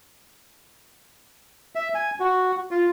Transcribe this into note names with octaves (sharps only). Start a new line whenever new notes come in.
E5
G#5
F#4
F4